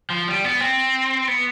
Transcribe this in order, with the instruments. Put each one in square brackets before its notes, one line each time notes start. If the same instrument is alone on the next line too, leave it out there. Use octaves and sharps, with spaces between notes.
[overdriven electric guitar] F3
G3
B3
C4
B3